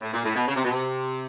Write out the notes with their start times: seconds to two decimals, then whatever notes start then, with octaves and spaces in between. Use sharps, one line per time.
0.01 A2
0.13 A#2
0.24 A2
0.35 B2
0.48 C#3
0.55 C3
0.64 B2
0.71 C3